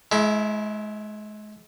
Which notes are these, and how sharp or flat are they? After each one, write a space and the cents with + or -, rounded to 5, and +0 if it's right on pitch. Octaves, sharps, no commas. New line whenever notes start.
G#3 +35 E4 +0